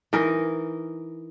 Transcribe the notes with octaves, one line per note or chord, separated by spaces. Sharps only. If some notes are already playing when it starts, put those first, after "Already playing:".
E3 D#4 A#4